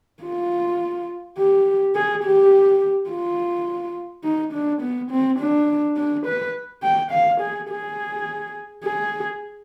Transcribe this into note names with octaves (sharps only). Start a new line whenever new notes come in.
F4
G4
G#4
G4
F4
D#4
D4
B3
C4
D4
D4
B4
G5
F5
G#4
G#4
G#4